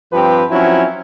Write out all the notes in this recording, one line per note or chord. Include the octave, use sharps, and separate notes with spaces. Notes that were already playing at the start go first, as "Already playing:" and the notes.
G2 F3 C4 G4 B4
F3 F#3 C4 C#4 E4